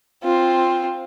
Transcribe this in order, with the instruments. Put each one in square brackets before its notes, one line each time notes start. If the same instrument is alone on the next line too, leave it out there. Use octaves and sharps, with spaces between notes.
[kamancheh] C4 F4